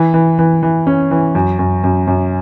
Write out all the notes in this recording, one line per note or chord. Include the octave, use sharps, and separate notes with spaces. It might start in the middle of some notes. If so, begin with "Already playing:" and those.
Already playing: E3
E3
E3
E3
C#4
E3
F#2
F#2
F#2
F#2